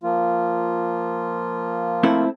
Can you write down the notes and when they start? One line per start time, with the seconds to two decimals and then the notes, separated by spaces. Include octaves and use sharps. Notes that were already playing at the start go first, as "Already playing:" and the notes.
0.03 F3 A#3 F4
2.03 A3 C4 E4